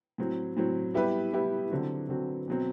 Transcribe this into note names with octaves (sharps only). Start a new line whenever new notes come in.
A2 F#3 C4
A2 F#3 C4
G3 B3 E4 G4 B4
G3 B3 E4 G4 B4
D3 F#3 C4 F#4
D3 F#3 C4 F#4
B2 F#3 C4